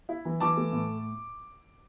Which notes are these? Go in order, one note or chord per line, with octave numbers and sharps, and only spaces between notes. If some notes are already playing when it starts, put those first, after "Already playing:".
E4
E3
E3 A5 D6
A3
A2